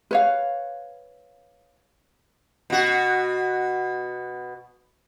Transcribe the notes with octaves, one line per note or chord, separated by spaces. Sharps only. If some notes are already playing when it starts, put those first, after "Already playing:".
B4 C#5 F5
B2 F#4